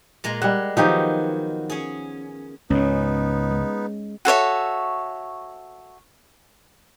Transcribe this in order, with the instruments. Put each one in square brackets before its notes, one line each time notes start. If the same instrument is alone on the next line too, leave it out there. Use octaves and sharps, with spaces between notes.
[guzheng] A#2 G#3 A#5
[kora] G3 F#5 [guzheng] G#3
[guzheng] D#3 F#3 B3 [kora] F3 D#4 G4
[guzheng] C#4 G#4
[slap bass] C#2 G#2 [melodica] B3 D#4 [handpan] C#4
[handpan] G#3
[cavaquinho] F#4 A4 C#5 E5